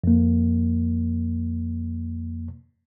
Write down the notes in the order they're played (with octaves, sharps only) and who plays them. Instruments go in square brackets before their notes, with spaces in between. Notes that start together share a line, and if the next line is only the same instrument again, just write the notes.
[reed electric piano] F2 A#3